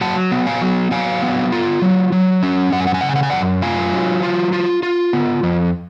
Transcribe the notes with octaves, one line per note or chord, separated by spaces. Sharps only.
F#3 F#5 A5
B3
F5 G#5
F#3
F#3 F5 G#5
B3
F4
F#3
F#3
C#4
F#2 F#5
G#5
F#5
G#5
C#3 F#5
G#5
F#5
G#5
F#2 D5 F#5
F4 F5 G#5
F#3
F4
F4
F4
B3
F2